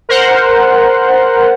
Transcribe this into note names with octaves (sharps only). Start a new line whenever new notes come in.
A#4 C5 F#5